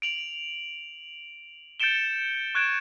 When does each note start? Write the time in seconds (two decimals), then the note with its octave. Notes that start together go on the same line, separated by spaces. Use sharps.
0.02 D7 F7 F#7
1.80 G6 A6 C#7 D7 E7 G7
2.55 C#6 F#6 G#6 D7 E7